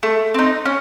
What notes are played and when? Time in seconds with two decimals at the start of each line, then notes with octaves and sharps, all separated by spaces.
0.03 A3
0.34 C4 D#4
0.65 C#4